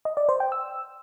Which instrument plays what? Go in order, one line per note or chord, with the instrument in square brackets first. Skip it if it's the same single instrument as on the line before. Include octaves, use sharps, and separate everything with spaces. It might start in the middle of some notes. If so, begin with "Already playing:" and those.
[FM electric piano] D#5
D5
C5
G5
E6